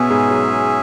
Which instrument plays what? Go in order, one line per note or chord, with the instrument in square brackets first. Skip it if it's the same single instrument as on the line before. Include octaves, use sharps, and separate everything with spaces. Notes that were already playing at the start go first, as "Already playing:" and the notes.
Already playing: [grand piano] B2 B3 [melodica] C#4 G#4 E5
[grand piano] G#2 G#3
F#3